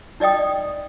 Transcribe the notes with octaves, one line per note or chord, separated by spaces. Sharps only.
D#4 D5 D#5 G5 D#6